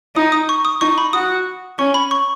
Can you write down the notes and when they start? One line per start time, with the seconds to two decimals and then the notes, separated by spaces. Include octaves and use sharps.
0.16 D#4 D#6
0.32 D#6
0.49 C#6
0.65 D#6
0.81 D#4 C#6
0.98 B5
1.13 F#4 D#6
1.78 C#4 C#6
1.94 B5
2.11 C#6